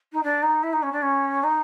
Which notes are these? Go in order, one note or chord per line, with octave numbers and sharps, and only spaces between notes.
D#4
D4
D#4
E4
D#4
C#4
D4
C#4
D#4